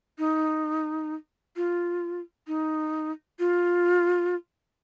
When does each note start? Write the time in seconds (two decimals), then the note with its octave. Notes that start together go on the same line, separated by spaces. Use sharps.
0.18 D#4
1.56 F4
2.48 D#4
3.39 F4